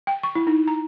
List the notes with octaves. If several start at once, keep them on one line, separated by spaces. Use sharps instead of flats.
G5
C#6
E4
D#4
A#5